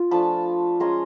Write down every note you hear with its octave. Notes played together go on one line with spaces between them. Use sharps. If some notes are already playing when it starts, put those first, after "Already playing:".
Already playing: F4
F3 A3 D4 A5 B5
G#3 C#4 F4 A#5 C6